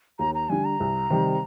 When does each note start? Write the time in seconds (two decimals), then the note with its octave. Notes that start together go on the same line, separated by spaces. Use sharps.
0.19 D#2 A#5
0.35 A#5
0.49 D3 G3 G#5
0.65 A#5
0.80 C2
1.10 C3 D#3 G3